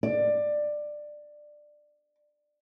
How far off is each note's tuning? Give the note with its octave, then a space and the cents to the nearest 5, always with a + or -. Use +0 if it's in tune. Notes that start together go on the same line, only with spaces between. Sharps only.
D5 +15